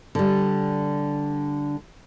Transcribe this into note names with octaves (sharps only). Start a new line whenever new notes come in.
D3 G3